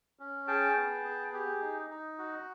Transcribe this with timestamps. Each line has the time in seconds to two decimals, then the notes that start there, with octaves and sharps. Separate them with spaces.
0.19 C#4
0.47 G#4 G5 A5
0.76 B3
1.05 G#4
1.33 G4
1.61 D#4
1.90 D#4
2.18 F#4